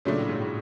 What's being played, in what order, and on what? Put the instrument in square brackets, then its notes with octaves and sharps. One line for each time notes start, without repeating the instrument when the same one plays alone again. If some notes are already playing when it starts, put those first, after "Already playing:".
[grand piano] A#2 [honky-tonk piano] C#3 F#3 A3 D4
[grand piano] A2
G#2
A2